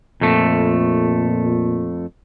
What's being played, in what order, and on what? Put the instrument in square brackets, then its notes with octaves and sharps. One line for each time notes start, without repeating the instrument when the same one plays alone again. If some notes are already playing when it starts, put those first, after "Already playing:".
[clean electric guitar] F2 A3 [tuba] A#2